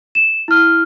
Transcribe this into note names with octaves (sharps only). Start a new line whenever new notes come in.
E7
E4 F6